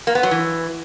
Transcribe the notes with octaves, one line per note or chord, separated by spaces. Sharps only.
A#3
B3
F#3
E3